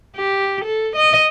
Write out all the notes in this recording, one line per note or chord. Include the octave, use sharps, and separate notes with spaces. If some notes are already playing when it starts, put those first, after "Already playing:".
G4
A4
D#5